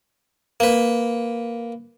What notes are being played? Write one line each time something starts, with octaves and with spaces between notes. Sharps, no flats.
A#3 B4